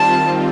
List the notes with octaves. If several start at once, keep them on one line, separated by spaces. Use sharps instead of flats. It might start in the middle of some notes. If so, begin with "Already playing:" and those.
Already playing: D#3 G3 C4 F4 A5